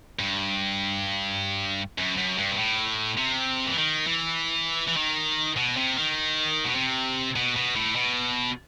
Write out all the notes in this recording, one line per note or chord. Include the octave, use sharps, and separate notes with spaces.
G2
F#2
F#2
G2
B2
A2
C3
E3
D#3
E3
E3
D#3
B2
C3
D#3
B2
C3
B2
B2
A2
B2